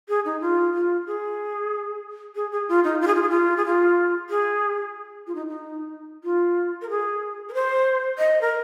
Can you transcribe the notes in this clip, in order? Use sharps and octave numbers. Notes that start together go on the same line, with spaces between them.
G#4
D#4
F4
F4
G#4
G#4
G#4
F4
D#4
F4
G#4
F4
G#4
F4
G#4
F4
G#4
F4
D#4
D#4
F4
A#4
G#4
A#4
C5
D#5
A#4